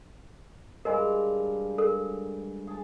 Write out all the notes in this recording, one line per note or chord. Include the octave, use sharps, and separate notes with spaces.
G2 G#3 A#4 D#5 F5 G#5
A4 A#4
G#4 A5